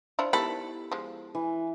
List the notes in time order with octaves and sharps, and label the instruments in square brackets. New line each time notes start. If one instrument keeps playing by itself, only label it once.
[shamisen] D4 E4 F4 [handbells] C5 D5 E5
[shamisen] D#3 [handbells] B3 E4 G4 [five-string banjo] A4 B5
[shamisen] F3 G#3
[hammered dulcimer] E3